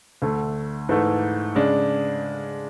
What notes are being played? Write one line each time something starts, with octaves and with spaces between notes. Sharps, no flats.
D2 D3 A3
G#2 E3 A3
C#3 G#3 D4